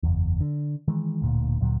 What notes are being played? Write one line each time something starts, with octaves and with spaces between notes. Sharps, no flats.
F#1 E2
D3
D#3 E3 G#3
D1 D2 A#2
D2 A#2 F#3